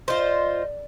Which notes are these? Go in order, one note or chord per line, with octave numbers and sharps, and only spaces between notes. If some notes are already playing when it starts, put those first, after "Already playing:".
F4 A4 C5 D5 D#5